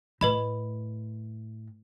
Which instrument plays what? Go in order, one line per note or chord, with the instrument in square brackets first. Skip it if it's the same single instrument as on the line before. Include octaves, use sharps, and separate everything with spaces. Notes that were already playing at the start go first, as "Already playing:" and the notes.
[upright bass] A2 [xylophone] B4 D#5 B5